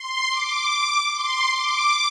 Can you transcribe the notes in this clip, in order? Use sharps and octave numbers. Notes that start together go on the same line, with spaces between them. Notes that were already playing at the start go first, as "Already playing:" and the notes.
Already playing: C6
D6
C6
D6